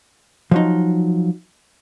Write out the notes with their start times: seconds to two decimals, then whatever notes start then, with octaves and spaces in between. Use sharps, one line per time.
0.51 F3 F#3 D#4